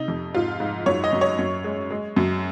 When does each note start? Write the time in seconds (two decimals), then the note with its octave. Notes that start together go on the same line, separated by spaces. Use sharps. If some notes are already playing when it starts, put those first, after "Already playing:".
Already playing: C3 D#4
0.08 F2
0.34 G#2 F4
0.60 G#2
0.86 F#2 C#5
1.04 D#5
1.13 F#2
1.21 C#5
1.39 F#2
1.64 G#3
1.91 G#3
2.17 F#2